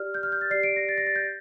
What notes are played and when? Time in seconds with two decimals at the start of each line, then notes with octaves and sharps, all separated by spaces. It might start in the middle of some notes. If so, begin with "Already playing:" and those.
Already playing: G4 D5 F6
0.14 G6
0.23 F6
0.32 G6
0.41 A6
0.51 G4 D5 C7
0.63 D7
0.76 A#6
0.89 A6
0.98 A#6
1.07 A6
1.16 G6